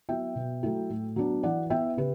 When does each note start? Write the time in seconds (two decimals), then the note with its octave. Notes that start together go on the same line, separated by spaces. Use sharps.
0.09 F#3 B3 E4 E5 G5
0.35 B2
0.63 F#3 A3 E4
0.90 A2
1.16 F#3 B3 D4
1.43 E3 D5 F#5
1.70 B3 E4 E5 G5
1.97 C#3 G4 B4